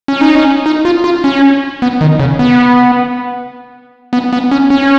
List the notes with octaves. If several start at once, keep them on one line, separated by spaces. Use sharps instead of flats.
C#4
D#4
C#4
D#4
F4
F4
C#4
B3
D#3
C#3
B3
B3
B3
C#4
C#4